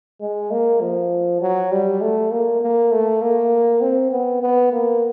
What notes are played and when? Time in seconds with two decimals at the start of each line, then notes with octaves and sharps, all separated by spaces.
0.21 G#3
0.51 A#3
0.81 F3
1.42 F#3
1.71 G3
2.01 A3
2.32 A#3
2.62 A#3
2.92 A3
3.22 A#3
3.82 C4
4.12 B3
4.42 B3
4.72 A#3